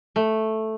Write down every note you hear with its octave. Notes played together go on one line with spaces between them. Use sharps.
A3